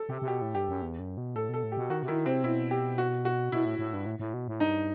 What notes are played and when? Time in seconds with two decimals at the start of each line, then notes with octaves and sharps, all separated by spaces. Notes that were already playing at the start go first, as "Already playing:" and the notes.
Already playing: A4
0.09 C3 G4
0.22 C3
0.28 B2 G4
0.42 A2
0.55 G2 G4
0.69 F#2
0.82 E2
0.99 F#2
1.17 B2
1.35 A2 A4
1.49 B2 A4
1.63 A2
1.72 G4
1.77 B2
1.90 D#3 F#4
2.03 C3
2.08 D#3 E4
2.26 C3 C4
2.43 B2 E4
2.71 G4
2.98 F#4
3.25 F#4
3.52 B2 E4
3.65 A2
3.79 A2
3.94 G2
4.06 A2
4.19 A2
4.34 B2
4.48 A2
4.60 G2 D#4